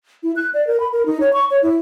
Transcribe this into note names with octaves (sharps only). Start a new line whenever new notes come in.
E4
F#6
D5
A#4
B5
A#4
D#4
C#5
C#6
C#5
E4